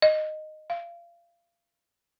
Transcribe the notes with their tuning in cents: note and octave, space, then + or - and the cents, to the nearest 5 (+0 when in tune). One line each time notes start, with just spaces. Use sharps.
D#5 -10
F5 -30